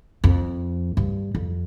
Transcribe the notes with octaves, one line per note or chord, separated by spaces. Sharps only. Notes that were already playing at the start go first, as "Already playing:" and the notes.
F2
G2
F2